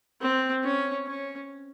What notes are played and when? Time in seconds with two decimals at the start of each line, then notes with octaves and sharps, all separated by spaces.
0.21 C4
0.64 C#4
1.07 C#4